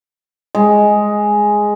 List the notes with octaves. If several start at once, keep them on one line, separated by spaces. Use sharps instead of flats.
G#3